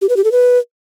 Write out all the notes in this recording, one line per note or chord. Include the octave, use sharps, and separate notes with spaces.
G4
B4
G4
A4
B4